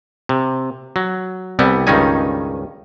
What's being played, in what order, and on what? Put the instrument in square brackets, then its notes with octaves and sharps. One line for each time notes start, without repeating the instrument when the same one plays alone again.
[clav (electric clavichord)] C3
F#3
C2 G3 B3 E4
C#2 G2 D#3 C#4 D#4 G#5